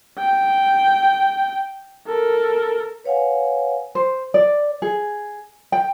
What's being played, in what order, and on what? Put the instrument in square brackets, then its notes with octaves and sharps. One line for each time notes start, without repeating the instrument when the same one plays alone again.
[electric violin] G5
A4 A#4
[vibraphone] B4 C#5 F5 F#5 G#5
[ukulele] C5
D5
G#4
G5